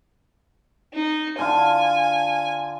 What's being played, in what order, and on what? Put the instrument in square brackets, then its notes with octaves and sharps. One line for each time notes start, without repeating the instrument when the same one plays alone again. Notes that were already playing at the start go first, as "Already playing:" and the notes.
[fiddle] D#4
[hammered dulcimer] D3 F4 [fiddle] G#5